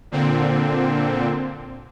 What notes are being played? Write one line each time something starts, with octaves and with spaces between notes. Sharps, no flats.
A#2 D3 C4